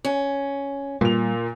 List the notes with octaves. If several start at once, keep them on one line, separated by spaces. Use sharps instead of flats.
C#4
A#2 G3 F7